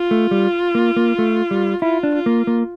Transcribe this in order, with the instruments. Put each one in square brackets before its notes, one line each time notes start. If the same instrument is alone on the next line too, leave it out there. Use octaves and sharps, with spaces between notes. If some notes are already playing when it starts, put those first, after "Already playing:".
Already playing: [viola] F4
[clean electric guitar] A3
G3
A#3
A#3
A3
G3
[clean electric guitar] E4 [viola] F4
[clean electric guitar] D4
[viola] F4
[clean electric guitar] A#3
A#3